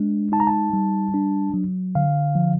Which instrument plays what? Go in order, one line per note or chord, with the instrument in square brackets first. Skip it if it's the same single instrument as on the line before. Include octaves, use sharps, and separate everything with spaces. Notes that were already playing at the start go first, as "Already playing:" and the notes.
Already playing: [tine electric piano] G#3 D4
D#4 A5
A#5
A5
G3
D4
F#3
D3 F5
F3